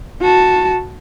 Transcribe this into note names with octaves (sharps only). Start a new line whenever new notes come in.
F#4 A5